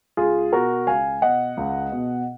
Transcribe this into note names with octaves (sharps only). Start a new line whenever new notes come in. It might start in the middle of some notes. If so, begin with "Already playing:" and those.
C#2 F4 G#4
B2 F#4 A#4
C#2 F5 G#5
B2 D#5 F#5
C#2
B2